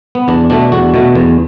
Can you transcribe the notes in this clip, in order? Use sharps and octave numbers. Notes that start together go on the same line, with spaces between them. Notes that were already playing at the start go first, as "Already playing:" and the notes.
B3
E2 D4
B2 A3 D4
E2 D4 F#4
B2 A3
E2